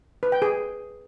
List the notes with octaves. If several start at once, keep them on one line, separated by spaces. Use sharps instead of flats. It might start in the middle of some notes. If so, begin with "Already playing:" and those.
B4
G5
G#4